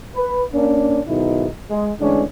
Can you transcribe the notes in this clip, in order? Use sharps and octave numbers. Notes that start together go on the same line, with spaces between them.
B4
A#3 C#4 D4
B1 G#2 B2 D#3 D#4 E4
G#3
D3 E3 G#3 A3 C#4 D4